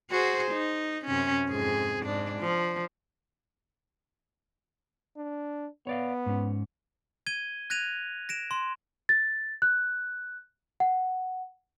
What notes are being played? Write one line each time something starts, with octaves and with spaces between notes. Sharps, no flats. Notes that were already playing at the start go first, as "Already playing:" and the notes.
F#4 G#4 C5
D#4
F#2 C3 C#4
F2 G#2 G#4
G#2 D4
F3
D4
B3 C#5 D5 F5
G#2 C#4
G#6 D#7 G7
F#6 G#6 A#6 D#7 F7
A#6 D7 E7
C6
A6
F#6
F#5